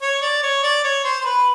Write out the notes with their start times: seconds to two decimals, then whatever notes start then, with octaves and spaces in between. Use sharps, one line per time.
0.02 C#5
0.22 D5
0.42 C#5
0.63 D5
0.84 C#5
1.04 C5
1.21 C5
1.25 B4